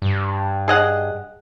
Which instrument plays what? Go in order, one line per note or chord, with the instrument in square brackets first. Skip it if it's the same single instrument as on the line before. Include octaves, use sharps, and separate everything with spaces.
[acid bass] G2
[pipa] G#4 D#5 F#5